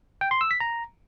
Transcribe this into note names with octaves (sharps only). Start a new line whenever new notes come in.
G5
C6
E6
B6
A#5